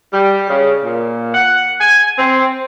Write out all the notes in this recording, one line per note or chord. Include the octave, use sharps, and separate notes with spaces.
G3
C#3
A#2
F#5
G#5
C4